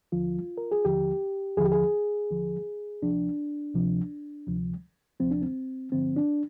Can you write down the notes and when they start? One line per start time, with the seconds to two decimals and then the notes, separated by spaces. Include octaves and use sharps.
0.12 D#2 D3 F3 F4
0.58 A#4
0.72 G#4
0.85 D#2 D3 F3 G4
1.57 D#2 D3 F3 G#4
1.65 G4
1.72 G#4
2.30 D#2 D3 F3
3.02 D2 C3 F3 D4
3.75 D2 C3 F3
4.47 D2 C3 F3
5.20 D2 C3 F3 C4
5.31 D4
5.42 C4
5.92 G2 D3 F3 C4
6.16 D4